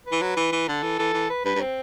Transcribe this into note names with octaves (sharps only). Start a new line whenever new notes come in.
B4
E3
F#3
E3
E3
D3 A4
E3
E3 A4
E3
B4
G2 B4
G2
C4